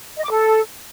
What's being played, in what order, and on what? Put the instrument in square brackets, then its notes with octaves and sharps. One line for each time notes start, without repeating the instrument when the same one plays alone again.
[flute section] D#5
D6
A4